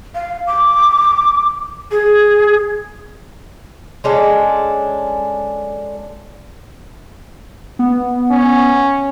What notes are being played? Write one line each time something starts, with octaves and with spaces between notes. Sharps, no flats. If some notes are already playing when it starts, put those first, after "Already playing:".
F5
D6
G#4
G#3 C#4 D4 A4
B3
C#4